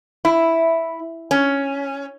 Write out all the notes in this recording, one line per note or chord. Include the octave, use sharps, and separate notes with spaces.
E4
C#4